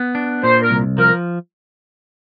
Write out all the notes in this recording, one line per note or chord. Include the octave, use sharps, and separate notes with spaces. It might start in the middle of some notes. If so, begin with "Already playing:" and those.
Already playing: B3
D4
A#2 C5
A#4
C2
F3 A#4